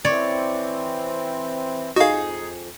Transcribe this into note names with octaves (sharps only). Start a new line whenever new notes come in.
E3 C4 C#5 D5
F2 D#4 F#4 G#4 F5